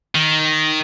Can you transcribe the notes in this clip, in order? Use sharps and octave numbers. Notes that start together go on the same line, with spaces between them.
D#3